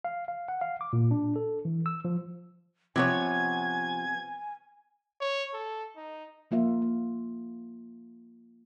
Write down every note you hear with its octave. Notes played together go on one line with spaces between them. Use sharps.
F5
F5
F#5
F5
D6
A#2
D4
A4
E3
E6
F3
C3 F3 B3 C#5 G#5 G#6
C#5
A4
D#4
F3 A#3 F4 E5
A#3